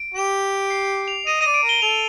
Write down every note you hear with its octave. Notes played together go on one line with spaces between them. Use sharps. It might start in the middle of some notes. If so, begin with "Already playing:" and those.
Already playing: D7
G4
C7
F7
D#5 D#7
D5 D#5 D#7
D7
A#4
G7
A4 F7